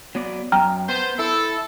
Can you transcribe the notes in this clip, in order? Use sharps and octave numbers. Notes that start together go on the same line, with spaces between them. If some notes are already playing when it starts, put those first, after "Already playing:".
F#3 B3 D5
F#2 G5 A#5 F6
B3 C5
E4 A4